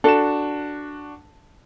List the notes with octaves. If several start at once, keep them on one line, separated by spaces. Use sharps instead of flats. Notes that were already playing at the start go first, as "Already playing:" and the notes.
D4 F#4 A4 E7